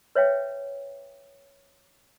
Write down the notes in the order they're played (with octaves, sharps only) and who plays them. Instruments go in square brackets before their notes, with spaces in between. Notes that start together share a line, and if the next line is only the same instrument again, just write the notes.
[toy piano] B4 C#5 E5 F5 G5